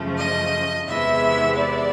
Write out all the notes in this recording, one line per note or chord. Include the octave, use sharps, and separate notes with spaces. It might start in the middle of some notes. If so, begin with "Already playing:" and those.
Already playing: F#2 C#3 F3 A3
D#5
E2 C3 E3 G#3 B3 E5
D5